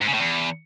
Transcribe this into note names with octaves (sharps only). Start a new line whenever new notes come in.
G#2
C#3
A2
E2